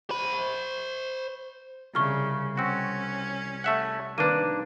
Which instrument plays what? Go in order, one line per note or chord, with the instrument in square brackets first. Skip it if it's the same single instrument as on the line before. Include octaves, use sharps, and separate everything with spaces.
[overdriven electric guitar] C5 B5
[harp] C2 [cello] C#3 [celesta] C#6 F6
[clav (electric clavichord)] C4 F#4 [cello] C#4
[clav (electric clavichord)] A3 E5 F#5
[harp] D#3 C4 [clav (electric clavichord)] A#3 D4 [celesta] B4 D6 D#7